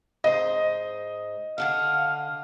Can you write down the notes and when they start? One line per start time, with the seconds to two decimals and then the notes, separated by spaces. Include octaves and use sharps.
0.24 G#2 C5 D#5
1.58 D3 D4 F5 F#5